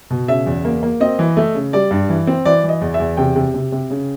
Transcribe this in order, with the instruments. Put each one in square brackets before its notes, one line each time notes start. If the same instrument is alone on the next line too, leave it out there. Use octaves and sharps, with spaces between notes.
[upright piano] B2
C#3 E5
E2
A#3
A#3
C4 D#5
E3
A3
C#3
G3 D5
G2
E3
C4
E3 D5
E3
D#5
E2
E5
E2
C3 G5
C3
C3
C3
C#3